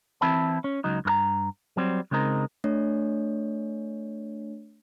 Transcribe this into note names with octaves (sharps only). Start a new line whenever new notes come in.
E3 C4 E4 A5 B5
C#4
C#2 F#3 D#4
G2 A#4 A#5
F#3 G3 C4
C#3 G#3 C4 D#4 A#4
A3 D4 C#5